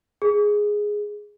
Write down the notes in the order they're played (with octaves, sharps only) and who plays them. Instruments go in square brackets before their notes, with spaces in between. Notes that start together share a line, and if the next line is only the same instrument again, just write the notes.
[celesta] G#4